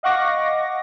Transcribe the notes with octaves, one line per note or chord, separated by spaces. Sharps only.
D#5 F5 F#5 C#6 D6 A#6